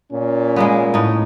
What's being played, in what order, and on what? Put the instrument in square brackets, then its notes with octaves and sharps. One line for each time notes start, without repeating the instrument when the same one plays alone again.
[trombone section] A#2 C#4
[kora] G#3 A#3 B3
A2 D#4